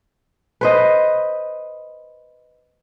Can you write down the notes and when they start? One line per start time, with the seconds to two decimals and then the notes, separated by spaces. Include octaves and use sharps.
0.61 B4 C5 D#5